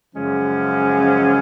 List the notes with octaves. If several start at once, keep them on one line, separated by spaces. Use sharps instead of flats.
F#2 C#3 F3 G#3 C#4